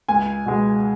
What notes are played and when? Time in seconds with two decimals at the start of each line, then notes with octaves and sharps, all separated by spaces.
0.09 C#2 G#5
0.46 B2 G#3